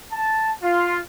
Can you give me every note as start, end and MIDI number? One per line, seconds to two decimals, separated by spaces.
0.12 0.51 81
0.63 0.99 65